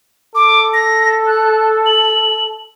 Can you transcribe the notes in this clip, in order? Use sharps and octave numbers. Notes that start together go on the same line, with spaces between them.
A4 D6
A#6
F#6
F#7